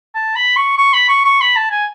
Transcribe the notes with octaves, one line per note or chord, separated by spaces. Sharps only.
A5
B5
C#6
C#6
B5
C#6
C#6
B5
A5
G#5